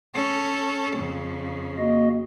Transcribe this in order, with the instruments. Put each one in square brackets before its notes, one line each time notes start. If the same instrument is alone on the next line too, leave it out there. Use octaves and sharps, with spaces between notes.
[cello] C#4 A4
F2 C#3
[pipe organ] A#3 F#4 D#5